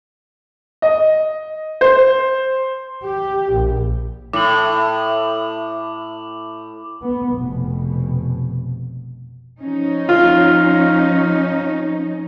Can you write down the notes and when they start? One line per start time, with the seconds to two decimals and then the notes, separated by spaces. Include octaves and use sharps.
0.82 D#5
1.81 C5
3.04 G4
3.50 A#1
4.33 A2 D6 F#7
7.02 B3
7.33 F1 B2
9.58 F3 C#4 D#4
10.09 F4